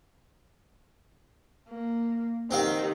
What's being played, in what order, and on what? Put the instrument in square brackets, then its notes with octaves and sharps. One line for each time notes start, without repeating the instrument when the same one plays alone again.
[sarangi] A#3
[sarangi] D#3 [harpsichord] C4 G4 F5